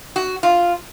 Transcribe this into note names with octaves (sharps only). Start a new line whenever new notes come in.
F#4
F4